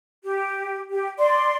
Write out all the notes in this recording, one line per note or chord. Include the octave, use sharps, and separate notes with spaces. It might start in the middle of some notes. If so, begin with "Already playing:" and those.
G4
G4
D5 C6